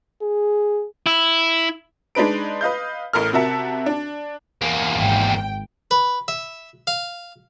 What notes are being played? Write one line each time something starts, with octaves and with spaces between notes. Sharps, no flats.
G#4
E4
G#3 D4 D#4 B4 D7
B4 D#5 F5 G6
A1 A2 A#4 F6
C3 F#4 A#4 E5 A5 C#7
D4
E2 A#3
G#1 G5
B4
E5
F5